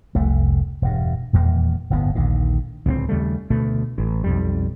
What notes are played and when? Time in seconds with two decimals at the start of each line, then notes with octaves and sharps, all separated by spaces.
0.15 F1 C2 A3
0.82 E1 G2
1.33 D#1 E2 A#3
1.90 D1 G1 A2 B3
2.15 A#1 D#2 D3 D#3
2.86 D1 C#2 B3 C4
3.09 D#2 C#3 G3 A3
3.50 D2 B2 A3
3.98 A1
4.24 B1 F2 G3